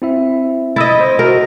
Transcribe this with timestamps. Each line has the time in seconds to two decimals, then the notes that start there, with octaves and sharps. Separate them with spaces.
0.02 C4 E4 E5
0.76 E4 D#5 D#6 E6 A6
1.00 C5
1.19 F#4 A#4